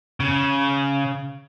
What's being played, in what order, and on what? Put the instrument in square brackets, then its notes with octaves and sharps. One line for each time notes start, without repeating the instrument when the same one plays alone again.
[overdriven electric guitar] C#3